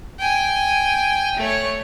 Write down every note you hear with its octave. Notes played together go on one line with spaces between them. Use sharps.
G5 G#5
A3 C#5